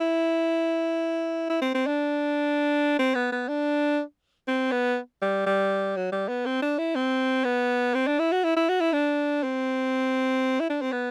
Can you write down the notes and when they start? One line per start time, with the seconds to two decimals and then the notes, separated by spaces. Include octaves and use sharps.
0.01 E4
1.50 E4
1.62 C4
1.75 C4
1.87 D4
2.99 C4
3.15 B3
3.32 B3
3.48 D4
4.48 C4
4.72 B3
5.22 G3
5.47 G3
5.97 F#3
6.12 G3
6.29 B3
6.46 C4
6.63 D4
6.79 E4
6.96 C4
7.45 B3
7.95 C4
8.08 D4
8.20 E4
8.32 F#4
8.45 E4
8.57 E4
8.70 F#4
8.81 E4
8.93 D4
9.44 C4
10.60 E4
10.70 D4
10.82 C4
10.92 B3